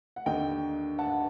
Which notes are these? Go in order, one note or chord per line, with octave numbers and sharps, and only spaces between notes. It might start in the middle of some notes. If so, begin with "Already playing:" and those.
F#5
D#2 D3 D#5 G5
F#5 A5